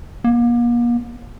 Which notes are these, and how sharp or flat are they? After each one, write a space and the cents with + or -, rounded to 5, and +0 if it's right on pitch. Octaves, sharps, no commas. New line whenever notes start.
A#3 +40